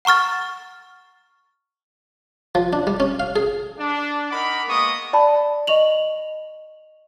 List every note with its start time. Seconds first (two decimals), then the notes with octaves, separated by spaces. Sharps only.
0.05 F#5 A#5 C#6 F6 A6
2.55 F3
2.73 D4
2.87 G3
3.00 C#4
3.20 F5
3.36 G#4
3.78 D4
4.30 D#4 A#4 F#5 B5 D6
4.68 G#3 A#3 B3 D#5 C#6 D#6
5.13 D5 A5 B5
5.67 D#5 C#6 F7 F#7